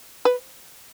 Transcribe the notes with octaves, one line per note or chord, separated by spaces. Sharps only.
B4